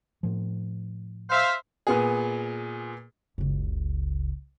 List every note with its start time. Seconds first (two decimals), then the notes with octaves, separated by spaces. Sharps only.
0.23 A2 F3
1.30 C5 E5 F5
1.87 A#2 B3 G#4
3.38 F#1 C#2